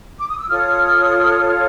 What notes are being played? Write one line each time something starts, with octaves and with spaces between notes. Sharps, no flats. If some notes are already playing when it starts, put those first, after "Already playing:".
D6
D#6
E6
F4 A4 C#5 D#6 F6